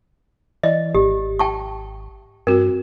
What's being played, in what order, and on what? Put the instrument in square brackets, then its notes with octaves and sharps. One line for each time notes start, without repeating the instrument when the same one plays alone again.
[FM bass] E3 [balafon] D5 [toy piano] D#5
[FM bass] G#1 [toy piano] G4
[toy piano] G5 A5 C#6
[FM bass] G2 [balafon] C4 F#4 [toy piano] A#4